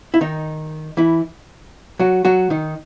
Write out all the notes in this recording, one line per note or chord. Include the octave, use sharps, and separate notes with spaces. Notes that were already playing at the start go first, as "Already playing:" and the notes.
E4
D#3 D#4
E3 E4
F#3 F#4
F#3 F#4
D#3 D#4